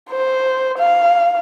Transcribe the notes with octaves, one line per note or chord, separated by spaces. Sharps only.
C5
F5